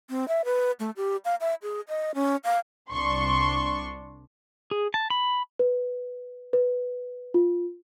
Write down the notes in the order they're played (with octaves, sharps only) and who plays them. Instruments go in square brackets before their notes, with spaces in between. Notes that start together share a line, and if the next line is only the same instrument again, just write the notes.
[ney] C4
E5
B4
A3
G4
F5
E5
G#4
D#5
C#4
F5
[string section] C2 D4 C6 C#6
[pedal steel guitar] G#4
A5
B5
[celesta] B4
B4
F4